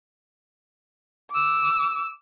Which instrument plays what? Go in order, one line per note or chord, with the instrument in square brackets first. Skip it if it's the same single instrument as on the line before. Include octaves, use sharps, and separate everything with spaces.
[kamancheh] D6 E6